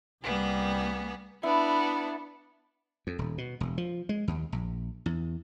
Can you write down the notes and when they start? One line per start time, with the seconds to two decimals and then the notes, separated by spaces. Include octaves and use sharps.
0.23 C2 G3 A#3 B3 G#4
1.43 B3 D4 E4
3.07 F2
3.19 D#1
3.38 B2
3.61 E1
3.78 F3
4.09 G#3
4.28 D#2
4.52 A#1
5.06 E2